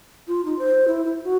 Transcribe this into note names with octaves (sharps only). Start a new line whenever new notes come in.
F4
D#4
C5
E4
E4
F#4